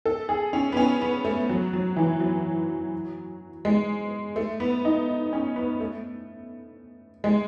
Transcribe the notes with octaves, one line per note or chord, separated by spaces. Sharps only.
A4
G#4
C#4
B3
C#4
B3
A3
F#3
F#3
E3
F#3
G#3
A3
B3
D#4
C#4
B3
A3
G#3